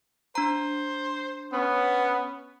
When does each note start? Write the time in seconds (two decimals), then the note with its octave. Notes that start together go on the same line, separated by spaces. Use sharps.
0.35 D4 C5 A#5
1.53 B3 C#4